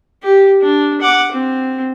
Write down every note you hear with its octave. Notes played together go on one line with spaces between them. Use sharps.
G4
D4
F#5 D6
C4